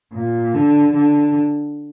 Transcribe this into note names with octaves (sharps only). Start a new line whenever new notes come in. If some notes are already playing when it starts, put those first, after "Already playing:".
A#2
D3
D3